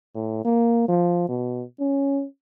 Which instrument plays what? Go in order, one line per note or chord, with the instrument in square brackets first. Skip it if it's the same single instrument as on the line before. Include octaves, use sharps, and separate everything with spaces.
[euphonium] A2
A#3
F3
B2
C#4